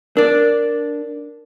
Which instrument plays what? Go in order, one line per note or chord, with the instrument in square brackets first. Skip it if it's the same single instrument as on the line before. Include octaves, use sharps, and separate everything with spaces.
[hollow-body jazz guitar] D4 D5 [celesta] A#4